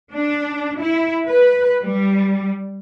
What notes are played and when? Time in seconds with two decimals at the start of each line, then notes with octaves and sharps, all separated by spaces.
0.12 D4
0.80 E4
1.28 B4
1.82 G3